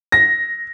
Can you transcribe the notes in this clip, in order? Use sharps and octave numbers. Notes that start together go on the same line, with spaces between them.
A#6